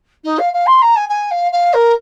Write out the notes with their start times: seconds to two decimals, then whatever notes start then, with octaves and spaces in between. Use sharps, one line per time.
0.24 D#4
0.39 F5
0.53 F5
0.66 C6
0.82 A#5
0.96 G#5
1.09 G#5
1.31 F5
1.52 F5
1.73 A#4